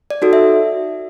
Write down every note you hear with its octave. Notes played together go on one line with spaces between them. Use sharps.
D5
D#4 F#4 A4
E5